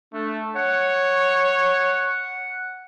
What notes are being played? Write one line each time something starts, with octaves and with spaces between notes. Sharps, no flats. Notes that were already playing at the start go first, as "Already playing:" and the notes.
A3 D4
C#5 F#5